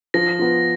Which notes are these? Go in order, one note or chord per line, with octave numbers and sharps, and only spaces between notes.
F3 A#6
B3 F4